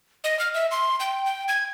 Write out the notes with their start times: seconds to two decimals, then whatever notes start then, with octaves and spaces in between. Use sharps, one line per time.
0.24 D#5
0.39 F6
0.54 E5
0.71 C6
1.00 G5
1.26 G5
1.48 G#6